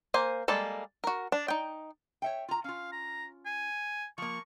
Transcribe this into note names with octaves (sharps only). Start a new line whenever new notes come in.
A#3 C5 G#5
G3 G#3 A#3 A4 A5
F#4 A#4
D4
D#4 G5
C#5 E5 G5
F4 A#5
C#4 F4 F5
A#5
G#5
F3 A#3 C#6